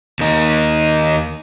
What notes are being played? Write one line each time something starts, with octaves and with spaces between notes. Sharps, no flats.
D#2 D#4